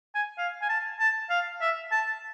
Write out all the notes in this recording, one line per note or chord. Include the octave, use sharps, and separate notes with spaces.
G#5
F5
G#5
A5
A5
F5
E5
A5